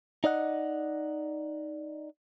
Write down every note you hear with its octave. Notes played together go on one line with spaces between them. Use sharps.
D#4 D5 D#5 F#5